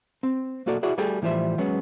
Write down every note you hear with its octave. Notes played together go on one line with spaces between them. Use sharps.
C4
B1 A#3 F#4 A4 D5
E4 F#4 G#4 D5
G3 A3 F#4 G#4 A4 G5
A2 E3 F3 G3 C5 E5
F#3 G#3 B3 C#4